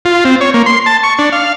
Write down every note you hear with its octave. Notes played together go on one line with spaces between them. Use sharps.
F4
C4
C#5
A#3
C6
A5
C#6
D4
F5